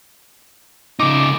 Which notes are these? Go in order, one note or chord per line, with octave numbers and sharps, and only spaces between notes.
C#3 D#4 D6